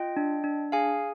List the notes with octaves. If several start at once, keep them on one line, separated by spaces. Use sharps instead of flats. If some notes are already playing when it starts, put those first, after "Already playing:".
Already playing: F4 D#5 G5
D4
D4
G#4 F5 G#5